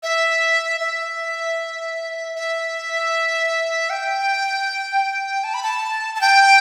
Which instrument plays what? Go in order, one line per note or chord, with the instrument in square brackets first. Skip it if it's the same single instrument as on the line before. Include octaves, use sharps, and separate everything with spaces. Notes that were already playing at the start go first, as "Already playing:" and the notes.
[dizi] E5
E5
E5
G5
A5
B5
A5
A5
G5